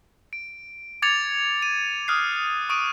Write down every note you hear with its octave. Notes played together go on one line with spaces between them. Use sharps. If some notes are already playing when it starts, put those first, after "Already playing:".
D7
D6 G#6 A6 C#7 F7
D#7
D#6 F6 F#6 C7
C#6 D#6 D7 D#7